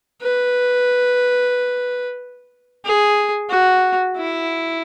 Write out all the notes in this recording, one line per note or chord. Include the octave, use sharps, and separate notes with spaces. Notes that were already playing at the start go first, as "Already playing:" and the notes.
B4
G#4
F#4
E4